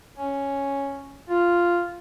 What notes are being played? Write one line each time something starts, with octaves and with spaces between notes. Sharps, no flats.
C#4
F4